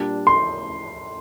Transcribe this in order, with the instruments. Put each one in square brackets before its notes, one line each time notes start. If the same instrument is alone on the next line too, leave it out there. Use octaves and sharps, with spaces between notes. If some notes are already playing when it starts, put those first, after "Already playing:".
Already playing: [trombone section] A#2 G3 D4
[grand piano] C6